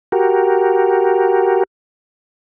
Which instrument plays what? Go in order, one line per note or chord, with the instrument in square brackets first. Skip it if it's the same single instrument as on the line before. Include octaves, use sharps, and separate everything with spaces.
[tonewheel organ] F#4 G4 A#4